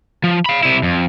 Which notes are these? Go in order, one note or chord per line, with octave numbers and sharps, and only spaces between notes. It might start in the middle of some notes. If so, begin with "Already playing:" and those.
F3
F5 B5
C3 E4
F2